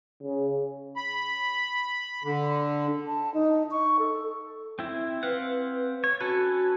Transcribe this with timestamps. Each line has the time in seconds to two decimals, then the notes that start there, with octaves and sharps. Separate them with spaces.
0.23 C#3
0.96 B5
2.24 D3
3.07 A5
3.34 D#4
3.71 C#6
3.99 A4
4.79 C4 E4
5.23 C4 B4 F5 F#5
6.04 C#5
6.21 C#4 F#4 A4 B4